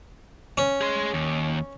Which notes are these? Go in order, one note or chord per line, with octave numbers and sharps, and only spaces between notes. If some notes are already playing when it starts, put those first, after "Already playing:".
C#4
G#4 C6
D#2